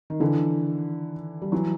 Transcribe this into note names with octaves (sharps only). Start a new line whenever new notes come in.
D#3
D3 E3
G3
E3 F#3